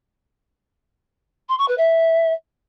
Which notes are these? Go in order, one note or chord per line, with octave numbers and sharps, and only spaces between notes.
C6
C#6
B4
E5